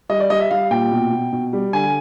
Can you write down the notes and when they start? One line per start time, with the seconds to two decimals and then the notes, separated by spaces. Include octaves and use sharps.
0.09 G3 D#5
0.20 D5
0.30 G3 D#5
0.41 E5
0.51 G3 F5
0.71 A#2 G5
0.92 B2
1.12 B2
1.32 B2
1.53 G3
1.73 D3 G#5